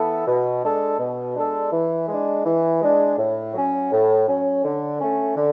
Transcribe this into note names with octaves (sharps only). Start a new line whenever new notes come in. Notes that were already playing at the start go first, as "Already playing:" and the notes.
Already playing: E3 B3 E4 A4
B2
G#3 D4 A4
B2
G#3 D4 A4
E3
G#3 D4
E3
G#3 D4
A2
F#3 C#4
A2
F#3 C#4
D3
A3 C#4
D3